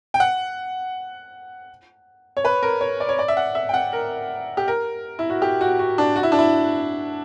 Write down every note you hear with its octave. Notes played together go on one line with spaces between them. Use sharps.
G5
F#5
C#5
B4
A#4
C#5
D5
C#5
D5
E5
F#5
E5
G5
F#5
A#4
G4
A#4
E4
F#4
G4
F#4
F#4
D4
F#4
E4
D4
E4